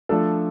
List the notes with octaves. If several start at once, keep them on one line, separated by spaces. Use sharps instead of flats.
F3 A3 D4 A4